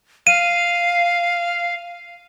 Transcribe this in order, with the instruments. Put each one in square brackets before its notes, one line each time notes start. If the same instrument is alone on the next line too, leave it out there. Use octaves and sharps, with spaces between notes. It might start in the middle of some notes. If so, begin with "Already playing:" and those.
[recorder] F5 [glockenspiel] D#7